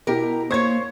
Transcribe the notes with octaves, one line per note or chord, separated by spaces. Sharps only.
B2 E4 G4 A#4
A#3 C5 C#5 C#6 G#6